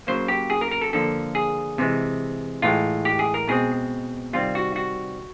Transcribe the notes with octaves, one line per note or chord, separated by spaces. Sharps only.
C#3 F#3 A#3 C5
G4
G#4
A#4
A#4
A4
D3 F3 A#3 A4
G#4
C3 E3 G#3
A2 E3 G#3 F4
G4
G#4
A#4
B2 G#3 C4 G#4
C3 D#3 G3 C4 F4
F#4
F#4